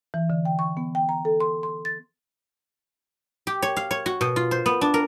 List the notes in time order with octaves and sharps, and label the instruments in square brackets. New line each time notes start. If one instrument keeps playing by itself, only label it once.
[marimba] E3
D3
G5
C#6
B3
G5
A#5
A4
C6
C6
A6
[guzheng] G4
C#5
F5
C#5
F#4
B2
F4
C5
B3
D4
A#4